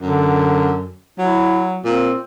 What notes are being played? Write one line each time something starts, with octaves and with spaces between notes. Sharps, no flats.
F#2 D3
F#3 E4
A#2 C4